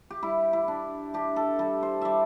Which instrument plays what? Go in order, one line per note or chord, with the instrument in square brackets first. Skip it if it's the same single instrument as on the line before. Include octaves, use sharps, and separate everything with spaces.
[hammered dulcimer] G4
G3 E4
E4
D4
D4 G4
A4
G3 A4
C5
G3 D5 E5